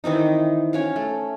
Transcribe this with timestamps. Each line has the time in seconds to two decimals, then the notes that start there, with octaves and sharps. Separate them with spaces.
0.04 D#3 E3 C4 D#4
0.73 C#4 C#5 F5
0.96 A3